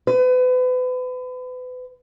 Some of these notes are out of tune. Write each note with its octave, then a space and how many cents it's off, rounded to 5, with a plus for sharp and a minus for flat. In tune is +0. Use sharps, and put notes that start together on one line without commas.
B4 +35